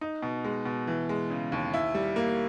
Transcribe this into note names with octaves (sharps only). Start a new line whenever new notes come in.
D#4
B2
G#3
B2
E3
G#3
C#3
D#2
E4
G3
A#3